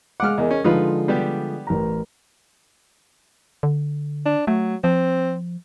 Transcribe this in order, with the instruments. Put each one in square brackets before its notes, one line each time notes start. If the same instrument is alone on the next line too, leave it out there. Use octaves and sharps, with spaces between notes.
[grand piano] G#3 F5 D6 [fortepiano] F#5 F6
[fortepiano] E2 [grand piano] G#4 A#4 D#5
[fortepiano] C#4
[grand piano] D3 F3 G#3 [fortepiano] D#4 F4 B4
[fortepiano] G3 B3 G4
[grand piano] A1 A#4 A#5
[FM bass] D3
[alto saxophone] D4
[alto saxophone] F#3 [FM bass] A3
[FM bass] F3 [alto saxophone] C4